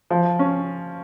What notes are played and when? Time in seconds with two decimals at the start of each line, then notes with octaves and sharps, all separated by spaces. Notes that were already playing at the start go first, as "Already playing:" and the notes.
0.10 F3
0.39 C#4